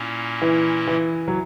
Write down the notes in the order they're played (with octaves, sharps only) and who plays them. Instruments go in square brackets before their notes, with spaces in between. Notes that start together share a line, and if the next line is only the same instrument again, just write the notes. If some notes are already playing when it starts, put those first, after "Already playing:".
Already playing: [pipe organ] A#2 A#3 C#4 E4
[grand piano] E3
E3
F#3